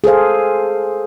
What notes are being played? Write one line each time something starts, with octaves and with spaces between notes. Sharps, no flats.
G#4 A4 C5 F5